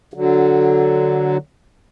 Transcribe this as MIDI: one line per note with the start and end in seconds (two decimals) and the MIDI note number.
0.14 1.37 50
0.14 1.37 54